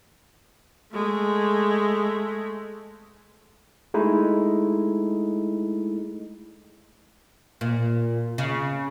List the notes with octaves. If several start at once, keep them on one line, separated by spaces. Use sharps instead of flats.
G#3 A3
G#3 A3 D#4 E4
A#2
C#3